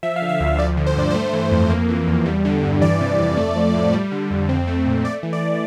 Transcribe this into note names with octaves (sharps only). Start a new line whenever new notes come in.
F3 E5
F5
D3
E5
D2
F3 D5
D3
C5
G2 D5
A3 C5
E3
F2
A#3
E3
E2
G3
D3
G2
E3 D5
C3
F2
A3
F3
A2
G3
D3
F2
C4
A3
A#2
A3 D5
E3
D5